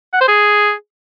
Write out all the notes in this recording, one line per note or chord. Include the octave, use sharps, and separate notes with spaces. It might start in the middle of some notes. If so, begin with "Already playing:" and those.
F#5
C5
G#4